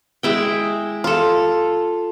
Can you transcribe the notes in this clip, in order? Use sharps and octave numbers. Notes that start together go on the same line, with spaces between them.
G#3 E4 G5
F4 A4